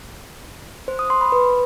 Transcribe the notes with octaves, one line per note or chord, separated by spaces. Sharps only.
C5
D#6
C6
B5
B4